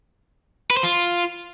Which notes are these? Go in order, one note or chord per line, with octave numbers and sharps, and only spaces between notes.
B4
C5
F4